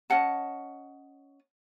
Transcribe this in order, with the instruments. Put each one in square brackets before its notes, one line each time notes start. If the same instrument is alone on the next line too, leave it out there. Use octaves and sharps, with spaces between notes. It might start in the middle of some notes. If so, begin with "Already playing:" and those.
[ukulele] C#4 D#5 F#5 A5